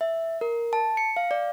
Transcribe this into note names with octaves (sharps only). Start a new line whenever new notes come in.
E5
A#4
A5
C#7
F5
D5